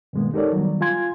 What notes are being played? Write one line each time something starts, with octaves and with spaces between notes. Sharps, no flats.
G2 B2 D#3 G#3 A#3 B3
D#4 G4 A4 A#4 C#5 D5
D#3 F#3 G3 B3
F4 F5 G#5 C6 G#6